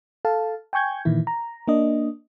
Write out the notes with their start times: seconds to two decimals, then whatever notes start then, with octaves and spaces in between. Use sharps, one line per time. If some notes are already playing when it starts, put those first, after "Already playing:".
0.25 A4 F5 A5
0.73 G5 G#5 C#6 G6 G#6
1.05 A#2 D#3 E3 E4
1.27 A#5
1.68 A#3 D4 D#5